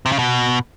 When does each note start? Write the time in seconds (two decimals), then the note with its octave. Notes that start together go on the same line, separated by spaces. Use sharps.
0.06 C3
0.12 C#3
0.19 B2